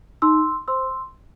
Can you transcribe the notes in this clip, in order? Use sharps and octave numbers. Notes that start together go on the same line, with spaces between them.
D#4 C6 E6
C5 C6 E6